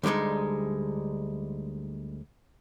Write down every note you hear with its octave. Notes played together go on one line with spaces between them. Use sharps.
D2 D3 G3 G#3 D#4